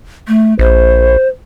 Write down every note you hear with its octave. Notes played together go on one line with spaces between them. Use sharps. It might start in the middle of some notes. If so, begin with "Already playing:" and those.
A3
A#1 C5